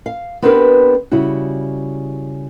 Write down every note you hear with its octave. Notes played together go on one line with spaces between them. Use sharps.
F5
B3 C4 D4 G4 A#4 B4
C#3 G3 E4 F#4